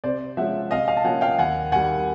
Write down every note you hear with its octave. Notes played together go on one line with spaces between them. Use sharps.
C3 C5 D5
F3 G#3 C#4 E5 F#5
C3 D#5 F5
D#5 F5
A5
F3 A#3 C#4 F#5 G#5
F5 G5
D#2 F#5 G#5
D#3 G3 F#5 G#5